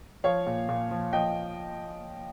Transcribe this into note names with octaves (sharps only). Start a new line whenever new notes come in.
F3 C#5 F5
A#2
A#2
F3
F3 D#5 G5